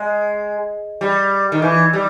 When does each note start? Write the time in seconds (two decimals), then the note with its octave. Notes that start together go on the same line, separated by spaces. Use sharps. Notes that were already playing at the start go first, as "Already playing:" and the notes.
Already playing: G#3
1.01 G3
1.52 D#3
1.62 E3
1.93 G3